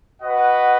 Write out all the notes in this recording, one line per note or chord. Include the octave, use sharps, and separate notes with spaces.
F#4 B4 D#5 F#5